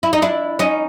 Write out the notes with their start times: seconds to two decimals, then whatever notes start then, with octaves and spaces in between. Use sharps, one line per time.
0.03 E4
0.13 D#4
0.22 D4 E4
0.59 C#4 D#4